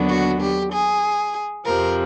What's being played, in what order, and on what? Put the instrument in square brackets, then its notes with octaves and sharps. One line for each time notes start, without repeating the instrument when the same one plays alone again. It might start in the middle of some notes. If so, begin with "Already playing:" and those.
Already playing: [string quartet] D#2 D3 F#3 B3 D4
F#4
G4
G#4
F2 C3 F3 A#4